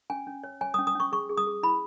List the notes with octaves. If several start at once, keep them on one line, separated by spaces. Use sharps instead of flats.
C#4 G#5
C#4
C#5
C#5 G#5
D#6
C#4
D#6
C#4 C#6
G#4 C#6
G#4
D#6
G#4
E4 B5